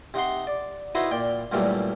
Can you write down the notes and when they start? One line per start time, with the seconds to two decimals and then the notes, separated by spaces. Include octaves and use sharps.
0.14 C3 D#4 F#5 C6
0.47 D5
0.95 D#4 E4 F#4 B4 C5 D#5
1.11 A#2 D5 G5
1.52 F#2 A#2 E3 G3 A3